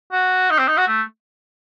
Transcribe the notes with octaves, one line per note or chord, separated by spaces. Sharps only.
F#4
D#4
C4
D#4
F#4
A3